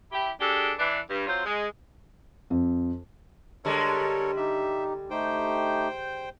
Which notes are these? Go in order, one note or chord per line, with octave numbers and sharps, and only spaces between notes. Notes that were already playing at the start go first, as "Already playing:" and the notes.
E4 G4
G#3 D4 G4 A4
E3 D4
G2
F#3 C4 F4 C5
G#3
F2
D3 G3 G#3 A4 A#4 C#5
D#4 G4 E5
A3 D#4 G4 C5 G5